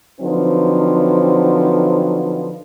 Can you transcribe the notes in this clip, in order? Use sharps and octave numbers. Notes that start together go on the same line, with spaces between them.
D3 F3 F#3 C4 D#4 B4